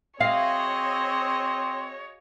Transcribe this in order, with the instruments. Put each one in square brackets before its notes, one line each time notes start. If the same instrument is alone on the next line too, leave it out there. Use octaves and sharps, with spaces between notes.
[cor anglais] C4 [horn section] F#4 G#4 D#5 [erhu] C#5 [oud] F5